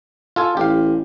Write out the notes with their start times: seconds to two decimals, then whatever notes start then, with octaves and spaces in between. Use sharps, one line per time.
0.36 F4 A4 G#5
0.57 A1 G4 F5